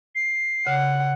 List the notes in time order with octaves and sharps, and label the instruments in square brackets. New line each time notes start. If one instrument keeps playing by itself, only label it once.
[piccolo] C7
[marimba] C#3 [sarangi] F#5